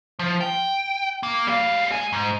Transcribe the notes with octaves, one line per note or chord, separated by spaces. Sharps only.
F3
G5
A#3
G3 F5
G#3 G#5
G#2